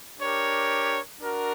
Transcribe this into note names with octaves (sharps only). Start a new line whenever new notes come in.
D4 G4 A#4 C#5
D4 F#4 A#4